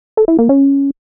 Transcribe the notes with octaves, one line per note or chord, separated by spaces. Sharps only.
A4
E4
A#3
C#4